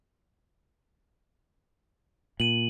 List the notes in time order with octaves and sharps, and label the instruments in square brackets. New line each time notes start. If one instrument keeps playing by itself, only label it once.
[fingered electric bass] A#2 [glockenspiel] D#7 F#7